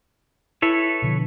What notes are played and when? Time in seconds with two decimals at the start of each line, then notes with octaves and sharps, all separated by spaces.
0.62 E4 A4 B4 C#5
1.02 B2 D3 F3